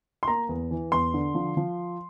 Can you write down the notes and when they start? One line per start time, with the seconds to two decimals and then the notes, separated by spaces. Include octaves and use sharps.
0.23 C6
0.27 A#3 A#5
0.49 E2
0.71 E3
0.92 E2 C6
1.14 D3
1.35 F3
1.57 F3